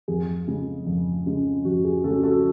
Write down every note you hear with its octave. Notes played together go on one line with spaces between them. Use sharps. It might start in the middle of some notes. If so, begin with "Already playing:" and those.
F2 G#4
C#3 G#3 C#4
F2
C#3 G#3 C#4
F2 F#4
G#4
C#3 G#3 C#4 F#4 A4
F#4 A4